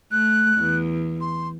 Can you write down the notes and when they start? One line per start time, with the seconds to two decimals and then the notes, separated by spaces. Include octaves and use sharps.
0.12 A3 F#6
0.57 E2
1.21 C6